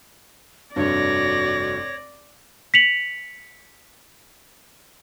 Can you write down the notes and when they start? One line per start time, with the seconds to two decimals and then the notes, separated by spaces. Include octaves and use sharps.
0.76 F1 G2 F#4 C#5 D5 A#6
2.74 B6 C#7 F7 F#7